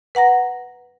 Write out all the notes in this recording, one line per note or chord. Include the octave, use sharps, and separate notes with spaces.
B4 F#5 A#5 A#6